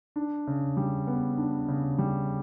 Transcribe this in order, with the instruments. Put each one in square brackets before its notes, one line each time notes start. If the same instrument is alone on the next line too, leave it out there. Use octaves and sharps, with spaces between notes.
[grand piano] D4
C#3
G3
B3
D4
C#3
G3